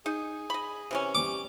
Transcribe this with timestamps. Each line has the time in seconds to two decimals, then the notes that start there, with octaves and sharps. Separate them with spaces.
0.06 D#4 G#4
0.50 D#5 B5
0.91 C3 E3 C#4
1.15 G3 D6